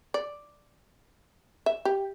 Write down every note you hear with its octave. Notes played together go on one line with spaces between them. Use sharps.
D5
E5
G4